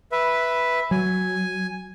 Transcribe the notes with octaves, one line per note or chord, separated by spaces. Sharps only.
B4 E5
F#3 G#5